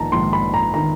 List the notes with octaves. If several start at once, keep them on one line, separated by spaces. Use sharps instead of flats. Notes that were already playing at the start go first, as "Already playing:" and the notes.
Already playing: A#1 G#2 D#3 A5 A#5
A#1 G#2 D#3 C6
B5
A#5
D#3 A#5